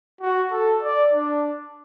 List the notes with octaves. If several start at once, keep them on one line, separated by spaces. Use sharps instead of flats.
F#4
A4
D5
D4